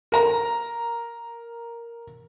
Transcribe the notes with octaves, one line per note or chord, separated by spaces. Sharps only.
A#4 A#5